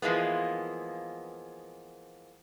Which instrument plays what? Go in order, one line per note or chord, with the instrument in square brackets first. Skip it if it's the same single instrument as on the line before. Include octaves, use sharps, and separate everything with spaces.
[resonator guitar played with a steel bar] E3 F3 G#3 A#3 B3